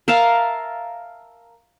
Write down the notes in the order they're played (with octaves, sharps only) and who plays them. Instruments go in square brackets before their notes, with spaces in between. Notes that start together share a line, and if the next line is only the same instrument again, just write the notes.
[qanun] A#4 E5 F5 A5